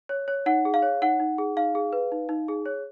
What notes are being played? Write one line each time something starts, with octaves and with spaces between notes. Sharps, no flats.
C#5
C#5
D#4 F#5
G#4
F5
C#5
D#4 F#5
D#4
G#4
D#4 F5
G#4
B4
D#4
D#4
G#4
C#5